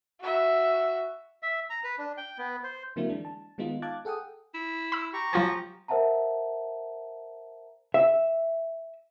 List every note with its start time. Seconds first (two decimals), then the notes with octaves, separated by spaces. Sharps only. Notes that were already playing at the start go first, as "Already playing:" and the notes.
0.21 F#4 E5
1.43 E5
1.70 A#5
1.84 B4
1.98 D4
2.17 G5
2.38 B3
2.64 C5
2.96 D3 F#3 A#3 C4 E4
3.09 E3 G#3 D4
3.25 A5
3.58 D#3 G#3 B3 D#4 F4
3.82 F5 A5 D6 F#6 G#6 A6
4.05 G#4 A4 F#5 G5 D#6
4.54 E4
4.92 B5 E6
5.13 G4 A#5 C#6
5.33 F3 F#3 F4 G#5
5.88 A#4 C5 E5 F#5 A5 A#5
7.94 E5